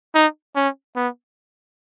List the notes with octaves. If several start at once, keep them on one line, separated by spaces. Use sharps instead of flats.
D#4
C#4
B3